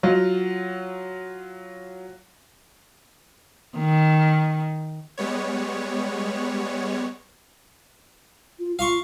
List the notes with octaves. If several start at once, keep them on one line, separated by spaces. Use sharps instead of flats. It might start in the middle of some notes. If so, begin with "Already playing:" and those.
F#3 F4
D#3
G3 G#3 B3 C#5
F4
F4 F5 C6 C#6